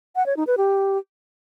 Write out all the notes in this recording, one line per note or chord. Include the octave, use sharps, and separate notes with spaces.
F#5
C#5
D#4
B4
G4